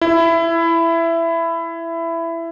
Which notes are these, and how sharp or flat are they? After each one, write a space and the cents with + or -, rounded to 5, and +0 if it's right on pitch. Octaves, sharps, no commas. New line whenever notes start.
E4 +15